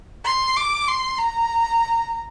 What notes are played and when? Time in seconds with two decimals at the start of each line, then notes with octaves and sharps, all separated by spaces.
0.25 C6
0.56 D6
0.88 C6
1.18 A#5